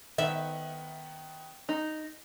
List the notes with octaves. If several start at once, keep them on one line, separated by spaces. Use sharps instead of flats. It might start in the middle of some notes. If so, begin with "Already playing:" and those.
D#3 B3 E5
D#4